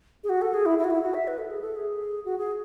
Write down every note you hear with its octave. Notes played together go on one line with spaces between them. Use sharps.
G#4
F#4
A4
G#4
E4
E4
F#4
E4
F#4
E5
B4
A4
G#4
A4
G#4
F#4
G#4